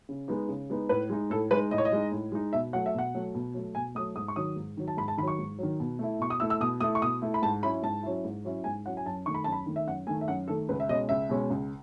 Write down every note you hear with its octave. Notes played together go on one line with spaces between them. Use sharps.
C#3
G#3 B3 D#4
C#3
G#3 B3 D#4
A2 B4
G#3 D#4
A2 A4
G#3 D#4 B4
A2 D#5
C#5
D#5
G#3 D#4
A2
G#3 D#4
B2 E5
F#3 A3 F#5
E5
B2 F#5
F#3 A3
B2
F#3 A3
B2 G#5
F#3 A3 D#6
G#2 D#6
C#6
D#3 F#3 D#6
G#2
D#3 F#3
A5
G#2 B5
A5
D#3 B5
F#3 C#6
G#2
D#3 F#3
B2
A3 E4
B2 C#6
D#6
A3 E4 E6
E6
B2 D#6
A3 E4 D#6
C#6
B2 D#6
A3 E4
B5
G#2 A5
F#3 C#4 E4 B5
G#2 A5
F#3 C#4 E4
G#2
F#3 C#4 E4
G#2 G#5
F#3 C#4 E4 F#5
G#5
F#2 A5
D#3 A3 C#6
B5
F#2 A5
B5
D#3 A3
E5
F#2 F#5
D#3 A3 G#5
E5
F#2 F#5
D#3 A3 A4
C#2 B4
E5
B2 G#3 C#4 D#5
C#2 E5
B2 G#3 C#4
C#2